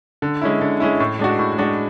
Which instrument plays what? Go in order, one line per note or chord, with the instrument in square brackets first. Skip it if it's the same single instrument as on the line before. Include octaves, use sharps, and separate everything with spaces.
[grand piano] D3
G#3 C#4 E4
D3
G#3 C#4 E4
A2
G#3 D4 F#4
A2
G#3 D4 F#4